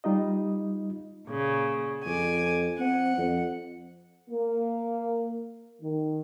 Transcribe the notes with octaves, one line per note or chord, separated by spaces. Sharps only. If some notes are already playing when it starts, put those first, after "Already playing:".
G3 D#4 F4 D#5
A#2 C#3
F2 G#5 D6
C4 F#5
F2
A#3
D#3